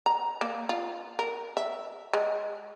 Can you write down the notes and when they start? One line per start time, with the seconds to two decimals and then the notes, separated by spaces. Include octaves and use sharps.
0.06 A#5
0.41 A#3
0.69 F4
1.19 A#4
1.57 E5
2.13 G#3